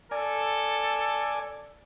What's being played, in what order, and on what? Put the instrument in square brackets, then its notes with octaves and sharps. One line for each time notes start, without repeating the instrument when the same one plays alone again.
[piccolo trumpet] A4 [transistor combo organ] D5 G#5